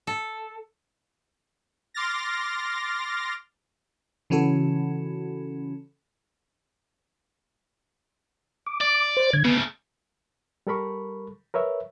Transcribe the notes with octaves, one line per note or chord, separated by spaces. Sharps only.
A4
C6 D6 F6 A6 A#6
C#3 E3 C#4 F#4 A4
D6
D5
C5
D3 G#6
D2 C#3 B3
G3 A4 A#4 B5 C#6
A#4 B4 C#5 E5